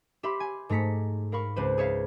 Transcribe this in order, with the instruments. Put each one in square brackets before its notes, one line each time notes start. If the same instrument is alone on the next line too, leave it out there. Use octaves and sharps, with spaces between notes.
[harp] G4 E5 B5 C6
G#5
G#2 A3 A#5 B6 C#7
A#4 F5 B5 C#6
C#2 C4 B4 C5
G#4 C#5 E5 F5